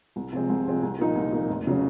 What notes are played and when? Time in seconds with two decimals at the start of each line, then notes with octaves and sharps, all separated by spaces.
0.16 C2
0.33 C3 F3 G#3 C4
0.49 C2
0.66 C3 F3 G#3 C4
0.83 C2
0.99 A#2 F3 A#3 D#4
1.15 C2
1.33 A#2 F3 A#3 D#4
1.49 F1
1.67 C#3 F#3 C#4